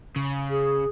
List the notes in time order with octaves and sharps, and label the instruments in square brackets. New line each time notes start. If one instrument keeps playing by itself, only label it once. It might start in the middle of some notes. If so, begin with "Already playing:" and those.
[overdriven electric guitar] C#3
[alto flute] G#4